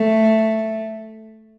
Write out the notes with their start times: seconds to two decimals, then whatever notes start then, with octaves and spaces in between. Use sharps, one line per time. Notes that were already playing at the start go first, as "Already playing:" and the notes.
Already playing: A3